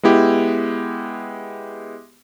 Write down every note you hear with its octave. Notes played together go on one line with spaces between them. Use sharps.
G#3 B3 E4 G4